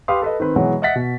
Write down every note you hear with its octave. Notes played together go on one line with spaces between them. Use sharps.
G4 B4 F5 C6 D#6
A4 B4 D#5
D#3 C4 B4
B2 E3 F#3 G#3 B3
D#5 E5 F#5 A6 B6
B2